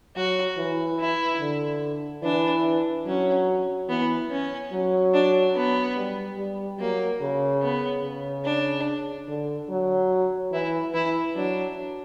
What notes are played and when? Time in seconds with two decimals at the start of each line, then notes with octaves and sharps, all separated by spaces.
0.16 F#3 F#4
0.57 E3
0.99 E4
1.40 D3
2.23 E3 D4
3.06 F#3 C#4
3.89 E3 B3
4.30 C#4
4.73 F#3
5.13 D4
5.55 B3
5.97 G3
6.38 G3
6.79 F#3 A#3
7.21 C#3
7.62 B3
8.04 C#3
8.45 D4
9.29 D3
9.70 F#3
10.52 E3 E4
10.94 E3 E4
11.35 F#3 D4